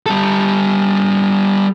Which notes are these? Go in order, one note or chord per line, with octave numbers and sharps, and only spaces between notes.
G3 A4